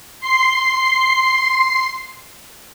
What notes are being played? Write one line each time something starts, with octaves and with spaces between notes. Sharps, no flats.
C6 C7